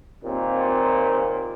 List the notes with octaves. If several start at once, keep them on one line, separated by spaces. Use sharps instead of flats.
D#2 A#2 C4